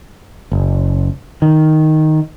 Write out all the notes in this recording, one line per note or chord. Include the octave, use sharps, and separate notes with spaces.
F#1
D#3